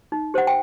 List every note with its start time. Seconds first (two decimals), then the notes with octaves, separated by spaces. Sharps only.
0.12 D#4
0.34 G4 C5 F#5
0.47 G5